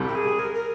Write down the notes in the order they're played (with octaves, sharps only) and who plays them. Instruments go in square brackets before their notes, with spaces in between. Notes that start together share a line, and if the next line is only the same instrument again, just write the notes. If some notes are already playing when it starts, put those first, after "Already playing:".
Already playing: [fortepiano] C2 C3 G3
[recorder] G4
G#4
A#4
A#4